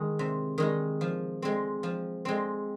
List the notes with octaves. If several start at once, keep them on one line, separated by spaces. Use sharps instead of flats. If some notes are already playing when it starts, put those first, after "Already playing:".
Already playing: D#3 G#3 D#4
C3
D#3 G#3 D#4
F3
G#3 C4
F3
G#3 C4